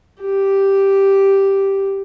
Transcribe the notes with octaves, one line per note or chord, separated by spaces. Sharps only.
G4